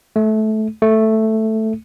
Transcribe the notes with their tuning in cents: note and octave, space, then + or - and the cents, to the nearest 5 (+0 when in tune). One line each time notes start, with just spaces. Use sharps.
A3 -20
A3 +0